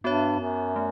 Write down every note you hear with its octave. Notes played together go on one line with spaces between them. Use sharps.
G2 B3 F#4 C#5 E5
F#2
A3